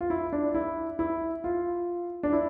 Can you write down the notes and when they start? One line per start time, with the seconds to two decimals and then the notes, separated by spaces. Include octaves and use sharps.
0.01 F4
0.10 E4
0.32 D4
0.54 E4
0.99 E4
1.44 F4
2.23 D4
2.32 E4